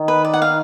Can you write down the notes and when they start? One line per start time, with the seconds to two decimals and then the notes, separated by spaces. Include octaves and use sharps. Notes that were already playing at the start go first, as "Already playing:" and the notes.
Already playing: D#3
0.08 B4
0.25 D5
0.34 F#5
0.42 F5